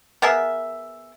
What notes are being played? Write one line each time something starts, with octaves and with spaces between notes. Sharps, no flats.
B3 G#4 A#4 E5